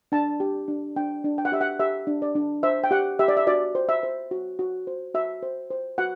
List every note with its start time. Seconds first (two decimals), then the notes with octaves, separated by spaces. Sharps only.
0.12 D4 A5
0.40 G4
0.68 D4
0.96 D4 G5
1.24 D4
1.38 G5
1.45 F#5
1.52 G4 E5
1.61 F#5
1.80 G4 E5
2.07 D4
2.22 D5
2.35 D4
2.63 C5 E5
2.84 G5
2.91 G4 F#5
3.19 G4 E5
3.28 D5
3.37 E5
3.47 F#4 D5
3.75 C5
3.89 E5
4.03 C5
4.31 F#4
4.59 F#4
4.87 C5
5.14 F#4 E5
5.43 C5
5.71 C5
5.98 F#4 F#5